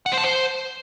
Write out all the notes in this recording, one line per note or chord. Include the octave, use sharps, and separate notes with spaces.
F#5
C5
A5
C5